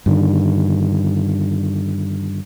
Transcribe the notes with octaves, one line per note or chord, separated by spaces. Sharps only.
G2 D3 D#3